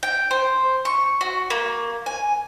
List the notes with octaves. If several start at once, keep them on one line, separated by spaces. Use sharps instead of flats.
G5
C5
C#6
F#4
A#3
G#5